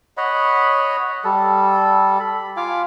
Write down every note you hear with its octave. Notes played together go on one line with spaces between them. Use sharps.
C#5 D#5 F#5 B5
G3 A4
B5
F4 F5 G#5 D6